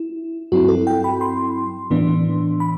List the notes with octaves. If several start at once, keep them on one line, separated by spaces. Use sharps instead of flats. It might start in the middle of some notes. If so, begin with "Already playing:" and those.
Already playing: E4
G2 F#3 C4 E4 F#4
A4
G5
B5
C6
A2 E3 B3 D4
B5